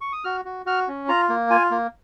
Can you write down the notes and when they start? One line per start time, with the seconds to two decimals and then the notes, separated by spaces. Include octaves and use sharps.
0.01 C#6
0.13 D#6
0.24 F#4 F6
0.45 F#4
0.66 F#4 F6
0.88 C#4
1.08 F4 A#5
1.29 A#3
1.50 F4 G#5
1.71 A#3